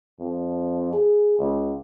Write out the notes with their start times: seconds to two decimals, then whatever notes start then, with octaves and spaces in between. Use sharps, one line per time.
0.20 F2
0.93 G#4
1.38 C#2